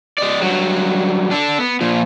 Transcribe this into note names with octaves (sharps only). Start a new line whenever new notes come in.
G#3 D5
G2 F#3
D4 A4
B3
A#2 F3